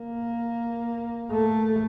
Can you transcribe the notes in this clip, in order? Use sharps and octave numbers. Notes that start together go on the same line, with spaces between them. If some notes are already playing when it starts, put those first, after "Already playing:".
Already playing: A#3
A3